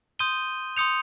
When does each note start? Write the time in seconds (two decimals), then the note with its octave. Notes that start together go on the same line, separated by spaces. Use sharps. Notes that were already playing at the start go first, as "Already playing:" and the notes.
0.19 C6 D#6 G6 D#7 G7
0.77 C6 D#6 G6 C#7 F7